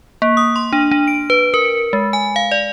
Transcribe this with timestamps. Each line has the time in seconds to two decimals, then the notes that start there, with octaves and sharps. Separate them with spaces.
0.22 A#3
0.37 D#6
0.56 C6
0.73 D4
0.91 D4
1.08 D7
1.30 B4
1.54 A#4
1.93 G#3
2.13 G#5
2.36 F5
2.51 D5